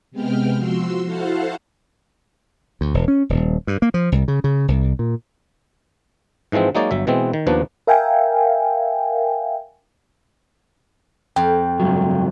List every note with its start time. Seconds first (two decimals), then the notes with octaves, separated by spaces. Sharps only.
0.11 C3 G#3 B3 G5 F6
0.56 F3 F#4 C6 E6
1.04 E4 F#4 A4 C5 F5 F#5
2.81 D2
2.94 E1
3.08 C#4
3.29 D#1
3.67 G2
3.82 A#3
3.94 F3
4.12 C2
4.28 C#3
4.44 C#3
4.68 C2
4.99 A#2
6.52 G#2 E3 F3 G#3 C4
6.75 F#3 G#3 A#3 D#4 C#5 D5
6.91 G1 F#3 E5
7.07 B2 E3 G#3 B3 C4
7.33 D#3
7.47 D#2 F3 B3 D4 B4
7.87 A#4 E5 F5 G5 G#5
11.36 F2 G5
11.80 C#2 G2 F#3